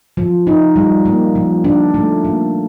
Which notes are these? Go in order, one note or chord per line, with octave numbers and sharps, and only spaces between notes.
F3
D#4
G3
A#3
F3
D4
A3
A#3